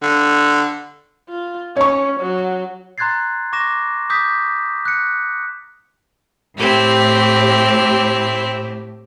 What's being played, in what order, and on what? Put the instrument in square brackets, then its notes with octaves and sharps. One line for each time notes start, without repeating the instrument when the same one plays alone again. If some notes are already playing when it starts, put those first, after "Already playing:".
[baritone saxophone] D3
[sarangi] F4
[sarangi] C#4 [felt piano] C#5 C#6
[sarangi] F#3
[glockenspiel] A#5 C6 F#6 G#6 A6 C7
C#6 D6 A#6 E7
D6 D#6 G6 B6
F#6 C#7
[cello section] A2 G4 [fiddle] C4 E4